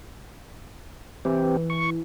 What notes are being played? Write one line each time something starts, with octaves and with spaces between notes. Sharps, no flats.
E3 C4 G4
C#6